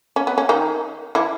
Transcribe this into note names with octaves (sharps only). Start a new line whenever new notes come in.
C#4
B3
C#4
D#3 D#4
E3 E4